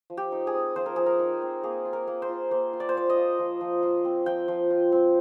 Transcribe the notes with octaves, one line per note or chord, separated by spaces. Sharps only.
F3
G4
D#4
G#4
C4
F3 C5
A#4
F3 G#4
A#4
D#4
C4
A#3 G#4
F4
A#4
A#3
C5
F4
A#3 C5
F4
D5
C5
A#3 D5
D#5
F4
F3
F3
F4
C4
F3 G5
F3
F4
C4